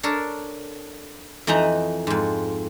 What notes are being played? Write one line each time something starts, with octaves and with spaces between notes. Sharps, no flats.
D4 A4 A#4 C#5
F2 E3 D#4 D#5 E5 A#5
F2 G#2